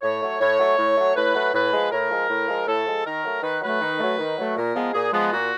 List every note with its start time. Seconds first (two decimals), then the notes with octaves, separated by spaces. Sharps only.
0.02 A2 C#5
0.21 F#3 A3
0.40 A2 C#5
0.59 F#3 A3
0.78 A2
0.97 F#3 A3
1.16 A2 B4
1.35 F#3 A3
1.54 A2 B4
1.73 F3 G#3
1.91 A2 A#4
2.11 F3 G#3
2.29 A2
2.48 F3 G#3
2.67 A2 A4
2.86 F3 G#3
3.05 D#3 A#4
3.24 F#3 A3
3.43 D#3 B4
3.61 F#3 A3 B4
3.81 D#3
4.00 F#3 A3
4.18 D#3
4.38 F#3 A3
4.56 A#2 A#4
4.75 F3 G#3 B3
4.94 A#2 G#4
5.13 F3 G#3 B3
5.32 A#2 F#4